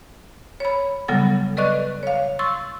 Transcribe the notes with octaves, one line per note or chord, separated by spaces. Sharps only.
C#5 B5
C#3 F#3 G3 B3 A4 F#5
A4 B4 D5 D#5 C#6 F#6
C#5 F5
C6 C#6 E6 A6